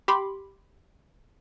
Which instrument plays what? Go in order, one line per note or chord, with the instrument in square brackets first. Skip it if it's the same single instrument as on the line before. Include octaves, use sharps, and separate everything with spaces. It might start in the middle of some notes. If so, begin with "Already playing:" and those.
[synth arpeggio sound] G4 B5 C6 D6